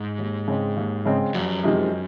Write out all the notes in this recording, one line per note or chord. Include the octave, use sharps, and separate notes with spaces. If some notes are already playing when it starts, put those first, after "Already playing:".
Already playing: G#2
D#2
C#3 G#3 C4
D#2
C#3 G#3 C4
F1 F#2
F2 C3 D#3 G#3